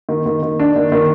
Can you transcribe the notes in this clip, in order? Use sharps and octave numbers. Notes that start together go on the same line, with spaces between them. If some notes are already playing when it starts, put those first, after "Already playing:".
D#3
D#3
D#3
D4
D#3
D#3